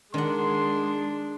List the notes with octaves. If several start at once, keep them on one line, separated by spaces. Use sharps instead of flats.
D#3 G#3 D4 F#5 C6